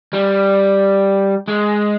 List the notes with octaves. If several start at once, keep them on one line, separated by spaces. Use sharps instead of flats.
G3
G#3